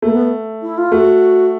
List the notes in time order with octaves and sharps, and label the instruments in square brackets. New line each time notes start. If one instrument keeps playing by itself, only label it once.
[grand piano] A3 [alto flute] A#3
[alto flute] B3
E4
F4
[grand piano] A3 [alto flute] F#4